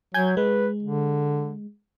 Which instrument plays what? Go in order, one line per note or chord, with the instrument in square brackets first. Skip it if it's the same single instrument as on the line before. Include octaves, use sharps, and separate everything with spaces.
[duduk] F#3 [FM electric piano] G#5 G6 G#6
[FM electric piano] G#3 [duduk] B4
[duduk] D3